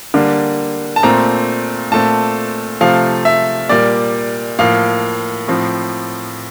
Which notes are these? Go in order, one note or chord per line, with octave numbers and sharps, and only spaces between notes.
D3 G3 A#3
A5
A#2 A3 C4 A#5
A#2 A3 C4 A5
C3 F3 A3 C4 F5
E5
A#2 G3 A#3 D5
A2 F3 A#3 F5
A2 F3 C4